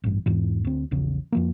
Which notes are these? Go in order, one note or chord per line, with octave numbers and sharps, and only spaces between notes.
A1 G2
E2 G#2 E3
D2 C4
A#1 E2 C#3
F2 F3 A#3